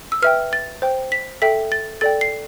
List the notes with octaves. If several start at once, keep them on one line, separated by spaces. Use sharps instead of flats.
E6
B4 E5 G5 F6
A6
C5 G5
B6
A4 E5 G5 B6
A6
A4 D5 G5 A6
C7